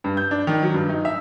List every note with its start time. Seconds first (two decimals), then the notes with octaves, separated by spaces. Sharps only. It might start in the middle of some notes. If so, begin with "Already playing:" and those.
0.04 G2
0.17 G6
0.31 D4
0.47 D#3
0.62 F#3
0.74 G2
0.89 D#4
1.05 E5